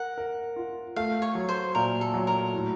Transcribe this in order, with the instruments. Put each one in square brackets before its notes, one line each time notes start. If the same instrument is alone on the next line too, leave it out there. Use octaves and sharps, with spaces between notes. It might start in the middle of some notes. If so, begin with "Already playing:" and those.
Already playing: [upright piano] A#4 [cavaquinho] F#5
[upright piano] A#4
F4
[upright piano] A3 [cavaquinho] F5
[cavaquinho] C#5
[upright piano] F#3
[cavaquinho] C5
[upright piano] A#2 [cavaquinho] A#4
[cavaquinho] A4
[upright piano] F#3
[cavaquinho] A#4
[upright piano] A2